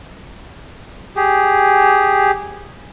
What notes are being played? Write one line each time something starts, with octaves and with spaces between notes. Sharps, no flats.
G4 G#4